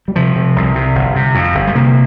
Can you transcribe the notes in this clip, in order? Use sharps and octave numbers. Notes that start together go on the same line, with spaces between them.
G3
C3 F3
C3
C2
C3
G1
C3
F2
G1
G3
C3 A#3